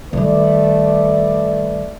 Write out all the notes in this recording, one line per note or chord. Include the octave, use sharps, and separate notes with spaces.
D#3 G3 A3 B4 D5